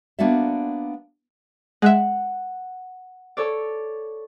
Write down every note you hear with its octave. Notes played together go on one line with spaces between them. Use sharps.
A#3 B3 D4 F#4 D5 E5
G#3 E5 F#5
A4 C#5 D5